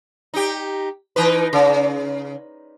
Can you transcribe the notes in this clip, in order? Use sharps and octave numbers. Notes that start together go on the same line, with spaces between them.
D#4 G4
E3 D#4 B4
C#3